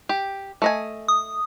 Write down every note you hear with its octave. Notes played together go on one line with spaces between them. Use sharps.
G4
A3 D#5 G#5
D#6